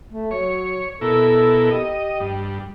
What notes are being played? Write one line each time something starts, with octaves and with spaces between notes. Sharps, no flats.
A3
F#3 C#5
B2 E4 A4 A#4
G4 D#5
G2